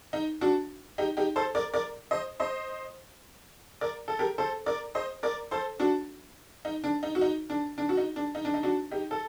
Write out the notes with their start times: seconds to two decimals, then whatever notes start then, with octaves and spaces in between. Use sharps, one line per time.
0.13 D#4
0.41 D4 F#4
0.98 D#4 G4
1.17 D#4 G4
1.36 A4 C5
1.55 A#4 D5
1.74 A#4 D5
2.11 C5 D#5
2.40 C5 D#5
3.81 A#4 D5
4.08 A4
4.19 G4 A#4
4.38 A4 C5
4.66 A#4 D5
4.95 C5 D#5
5.23 A#4 D5
5.51 A4 C5
5.80 D4 F#4
6.65 D#4
6.84 D4
7.03 D#4
7.15 F#4
7.21 D#4
7.50 D4
7.78 D4
7.89 F#4
7.97 D#4
8.16 D4
8.35 D#4
8.45 D4
8.54 D#4
8.63 D4 F#4
8.91 D#4 G4
9.11 A4